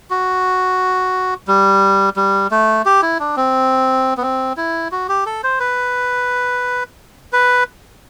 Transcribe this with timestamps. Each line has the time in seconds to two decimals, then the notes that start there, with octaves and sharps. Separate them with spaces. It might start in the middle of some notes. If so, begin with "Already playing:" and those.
0.10 F#4
1.48 G3
2.16 G3
2.51 A3
2.86 G4
3.02 E4
3.20 D4
3.36 C4
4.17 B3
4.22 C4
4.57 E4
4.92 F#4
5.09 G4
5.26 A4
5.44 C5
5.60 B4
7.33 B4